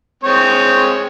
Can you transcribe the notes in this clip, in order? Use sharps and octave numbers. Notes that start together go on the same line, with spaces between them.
G#3 C4 C#5